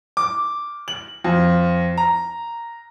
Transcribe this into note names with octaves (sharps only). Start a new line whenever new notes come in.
D6
F#7
F2
A#5